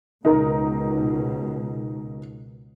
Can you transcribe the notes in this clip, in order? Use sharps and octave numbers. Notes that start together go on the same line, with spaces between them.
C#2 B2 D#4 A#4 A#5